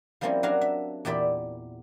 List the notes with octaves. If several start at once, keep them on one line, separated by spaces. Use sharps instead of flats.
F3 G3 A#3 C4 C#4 E4
F#3 D4 F#4 A#4 F5
E5
E2 A#2 G4 D5 E5 B5